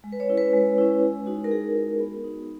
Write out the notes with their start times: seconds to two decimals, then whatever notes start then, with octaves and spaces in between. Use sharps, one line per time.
0.04 G#3
0.12 B4
0.20 C#5
0.29 C#4 E4
0.37 B4
0.53 G#3
0.78 C#4 E4
1.02 G#3
1.26 D#4 F#4
1.44 A#4
1.50 G#3 G#4
1.76 D#4 F#4
2.00 B3
2.24 D#4 F#4